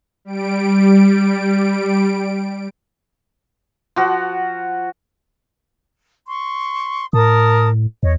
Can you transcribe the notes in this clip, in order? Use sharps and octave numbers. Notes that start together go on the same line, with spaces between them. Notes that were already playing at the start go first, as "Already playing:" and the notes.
G3 D7
F3 F#4 F#5
C6 C#6
A2 A#4 A5 D#6
E2 C#5 D#5